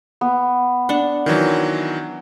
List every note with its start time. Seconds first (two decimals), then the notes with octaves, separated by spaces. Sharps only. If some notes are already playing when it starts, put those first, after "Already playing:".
0.21 B3
0.89 D4 F#5
1.26 D#3 E3 F#3